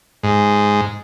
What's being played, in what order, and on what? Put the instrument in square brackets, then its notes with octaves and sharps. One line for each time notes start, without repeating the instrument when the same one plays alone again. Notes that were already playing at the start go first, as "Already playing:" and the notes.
[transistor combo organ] G#2